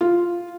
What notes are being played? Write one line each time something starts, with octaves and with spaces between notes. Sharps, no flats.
F4